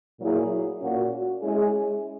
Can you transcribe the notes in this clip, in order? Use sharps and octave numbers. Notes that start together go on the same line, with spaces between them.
A#2 F#3 A#3 E4 G#4
A#2 A#3 C#4 F#4
G#3 C#4 E4 G#4